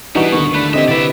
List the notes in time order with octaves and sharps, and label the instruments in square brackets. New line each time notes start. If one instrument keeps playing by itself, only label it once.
[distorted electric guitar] B2 [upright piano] E3 G3 [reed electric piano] D4 D#4 F#4
[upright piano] D#2 D3 [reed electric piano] B3 C#6
[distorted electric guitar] A3 [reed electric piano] D4 B5 F#6
[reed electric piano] D3 C4 G4 [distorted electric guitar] B4 E5 [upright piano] D#5
[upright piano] C2 B4 [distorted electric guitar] D5 E5